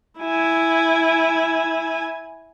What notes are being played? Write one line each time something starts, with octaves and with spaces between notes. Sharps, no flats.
E4 G#5